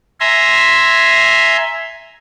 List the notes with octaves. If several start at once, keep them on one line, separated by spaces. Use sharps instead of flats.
E5 G#5 A#5 C6